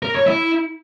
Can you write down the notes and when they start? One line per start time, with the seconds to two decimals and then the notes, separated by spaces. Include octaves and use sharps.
0.03 A#4
0.15 C#5
0.27 E4